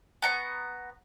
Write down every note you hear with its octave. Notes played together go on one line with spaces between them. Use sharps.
B3 A#5 C#6